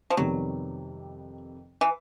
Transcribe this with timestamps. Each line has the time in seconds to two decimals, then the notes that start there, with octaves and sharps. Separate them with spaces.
0.10 F3
0.17 F2 C3 D#3 F#3 G3 B3
1.81 E3